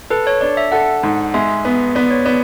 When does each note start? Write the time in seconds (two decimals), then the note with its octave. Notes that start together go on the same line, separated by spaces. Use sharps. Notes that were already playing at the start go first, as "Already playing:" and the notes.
0.10 A4 B4
0.27 C#5
0.41 D4 D5
0.57 E5
0.72 A4 F#5
1.03 G#2
1.34 G#3 E5
1.65 B3
1.95 B3 D5
2.11 C#5
2.26 B3 D5